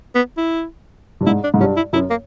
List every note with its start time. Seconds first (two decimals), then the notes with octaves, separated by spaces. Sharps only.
0.15 B3
0.37 E4
1.21 G2
1.26 G#2 E4
1.44 D4
1.54 G#2
1.60 G2 C#4
1.77 E4
1.93 F#2 E4
2.10 A#3